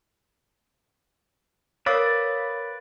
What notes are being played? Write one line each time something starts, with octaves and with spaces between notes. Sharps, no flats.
A#4 B4 C#5 D5 F5 D#6 E6